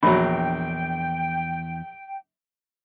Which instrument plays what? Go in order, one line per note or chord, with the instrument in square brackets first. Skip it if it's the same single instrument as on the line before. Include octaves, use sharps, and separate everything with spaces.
[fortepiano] A#1 F#3 [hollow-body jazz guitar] E2 D4 [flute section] G5 [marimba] B5